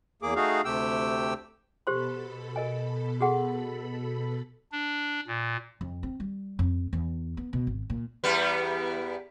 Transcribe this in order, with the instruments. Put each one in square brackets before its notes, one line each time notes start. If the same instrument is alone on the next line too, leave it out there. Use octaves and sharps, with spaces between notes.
[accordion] E2 A#3 G#4 D6
A3 D#4 F#4 G#4 F5
D2 C3 A3 G4 G5 E6
[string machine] B2 A4 B5 [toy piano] G4 C5 C6
[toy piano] A#4 D#5 G#5
F#4 G#4 F#5
[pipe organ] D4
A#2
[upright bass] F2
C4
G3
F2
E2
B3
B2
G#1
A#2
[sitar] E2 G3 B3